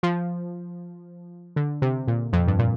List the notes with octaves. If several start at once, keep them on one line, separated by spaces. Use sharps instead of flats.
F3
D3
C3
A#2
F2
G2
A#2